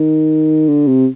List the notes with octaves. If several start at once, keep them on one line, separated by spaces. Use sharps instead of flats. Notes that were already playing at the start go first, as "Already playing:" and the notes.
Already playing: D#3
D3
C3